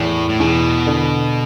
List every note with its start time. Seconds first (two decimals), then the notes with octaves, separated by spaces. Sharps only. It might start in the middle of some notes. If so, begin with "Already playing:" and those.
Already playing: E2 A2
0.29 A2
0.40 E2 B2
0.87 D3